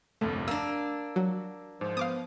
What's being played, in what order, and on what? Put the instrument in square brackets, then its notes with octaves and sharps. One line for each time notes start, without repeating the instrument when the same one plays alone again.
[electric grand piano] G1 C2 F2 [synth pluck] A3
[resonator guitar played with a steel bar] A#3 D4 [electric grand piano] E6
[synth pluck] F#3
[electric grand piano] G#2 [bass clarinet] F3
[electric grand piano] B3 [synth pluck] F5 D6 D#6